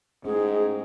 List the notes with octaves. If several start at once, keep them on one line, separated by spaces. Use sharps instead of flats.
G#2 A3 C#4 G#4